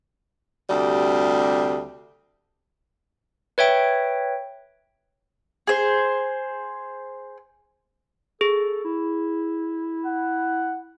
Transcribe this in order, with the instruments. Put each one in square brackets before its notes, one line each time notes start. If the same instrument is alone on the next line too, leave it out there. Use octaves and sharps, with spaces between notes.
[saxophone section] D2 C3 G3
[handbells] B4 C#5 E5 G5
[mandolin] G#4 C5
[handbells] G#4 [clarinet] A4
[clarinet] E4
[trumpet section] F#5